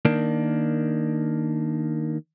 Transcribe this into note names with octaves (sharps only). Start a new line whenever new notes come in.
D#3 A#3 D4